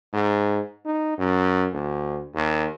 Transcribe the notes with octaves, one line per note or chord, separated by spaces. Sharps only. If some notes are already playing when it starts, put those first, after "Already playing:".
G#2
D#4
F#2
D2
D#2